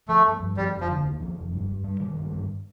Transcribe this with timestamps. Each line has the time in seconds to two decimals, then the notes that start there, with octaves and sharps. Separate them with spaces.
0.08 F3 A3
0.25 G2
0.40 G2
0.57 F3 G3
0.73 F1
0.81 F3
0.88 D3
1.04 D#2
1.21 F3
1.36 F1
1.52 G2
1.68 G2
1.84 G3
2.00 D#3
2.16 G2
2.32 G2